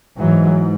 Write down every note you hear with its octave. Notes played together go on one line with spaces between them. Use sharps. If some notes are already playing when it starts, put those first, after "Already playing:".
G#2 E3 F#3